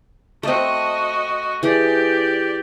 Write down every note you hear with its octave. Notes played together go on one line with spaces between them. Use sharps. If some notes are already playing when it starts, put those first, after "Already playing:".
A3 C4 F#4 D#5
E3 G4 G#4 D5